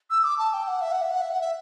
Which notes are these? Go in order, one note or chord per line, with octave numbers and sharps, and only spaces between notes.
E6
D6
A5
G5
F#5
E5
F#5
E5
F#5
E5
F#5
E5